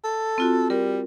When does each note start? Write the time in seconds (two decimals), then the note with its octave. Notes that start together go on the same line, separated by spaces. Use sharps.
0.04 A4
0.38 C4 F4 F#4
0.70 G3 A#4